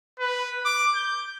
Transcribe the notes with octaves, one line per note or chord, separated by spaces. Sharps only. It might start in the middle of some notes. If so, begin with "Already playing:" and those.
B4
D6
G6